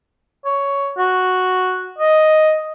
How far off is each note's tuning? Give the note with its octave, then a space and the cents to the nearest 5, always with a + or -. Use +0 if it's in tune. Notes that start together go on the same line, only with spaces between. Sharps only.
C#5 +10
F#4 -5
D#5 +0